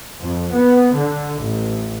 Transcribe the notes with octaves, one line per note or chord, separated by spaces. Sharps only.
F2
B3
D3
A1